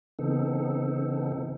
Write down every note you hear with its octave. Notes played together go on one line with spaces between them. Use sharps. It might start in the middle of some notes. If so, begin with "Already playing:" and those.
C#3 E3 B3 C4 D#4 A4